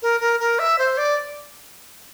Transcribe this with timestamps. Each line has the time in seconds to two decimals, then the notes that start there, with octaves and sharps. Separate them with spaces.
0.02 A#4
0.21 A#4
0.40 A#4
0.59 E5
0.78 C5
0.97 D5